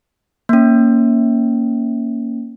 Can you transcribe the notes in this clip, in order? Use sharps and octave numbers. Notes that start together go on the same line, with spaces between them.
A#3 C#4